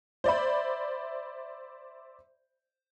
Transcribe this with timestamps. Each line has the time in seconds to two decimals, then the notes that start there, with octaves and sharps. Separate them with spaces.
0.24 C5 D5 E5 B5